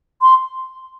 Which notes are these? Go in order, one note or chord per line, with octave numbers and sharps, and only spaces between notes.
C6